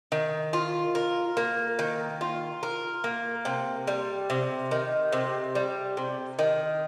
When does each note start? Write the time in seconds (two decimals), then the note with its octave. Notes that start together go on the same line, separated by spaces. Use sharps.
0.12 D#3
0.53 F4
0.95 A#4
1.37 A#3
1.79 D#3
2.21 F4
2.63 A#4
3.04 A#3
3.45 C3
3.87 G3
4.30 C3
4.71 D#3
5.12 C3
5.55 G3
5.97 C3
6.39 D#3